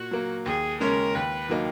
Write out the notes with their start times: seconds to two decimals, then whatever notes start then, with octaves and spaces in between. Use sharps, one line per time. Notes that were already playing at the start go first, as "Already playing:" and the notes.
Already playing: A#2 F#4
0.11 F#3 A#3
0.45 D#2 G#4
0.80 C#3 G#3 C#4 A#4
1.15 D#2 B4
1.49 D#3 F#3 A#3 D#4